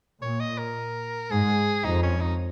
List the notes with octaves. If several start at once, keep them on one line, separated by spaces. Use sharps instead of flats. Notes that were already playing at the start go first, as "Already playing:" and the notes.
A#2 C#5
D#5
A#4
G#2 G#4
F2 D#4
C#4
D#4